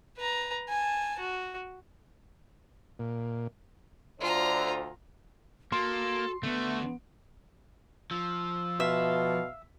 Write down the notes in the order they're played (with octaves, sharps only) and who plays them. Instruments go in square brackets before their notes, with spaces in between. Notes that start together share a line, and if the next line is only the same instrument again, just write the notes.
[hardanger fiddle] B4 A#5
G#5 A5
F#4
[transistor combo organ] A#2
[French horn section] D2 D3 C5 [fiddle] F4 A#5
[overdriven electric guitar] A#3 [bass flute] F#4 [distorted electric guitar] A4 [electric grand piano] C6
[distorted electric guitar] D3 F#4 [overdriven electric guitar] A3 [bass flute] B3
[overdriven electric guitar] F3 [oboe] E6
[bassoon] B2 [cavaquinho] E5 [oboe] F5